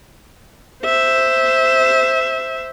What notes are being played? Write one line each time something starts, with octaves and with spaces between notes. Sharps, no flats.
C5 E5